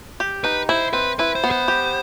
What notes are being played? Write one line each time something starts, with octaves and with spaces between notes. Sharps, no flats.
G4
D#4 B4
E4 C5
C4 B4
E4 B4
C5
B3
C5
G4